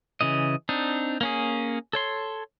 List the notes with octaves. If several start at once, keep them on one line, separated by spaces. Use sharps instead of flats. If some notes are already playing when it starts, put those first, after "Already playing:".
C#3 E3 D#5
C4 D4 D#4
A#3 C#4 G#4
A4 C#5 C6